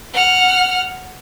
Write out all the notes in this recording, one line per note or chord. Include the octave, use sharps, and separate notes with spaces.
F#5 F6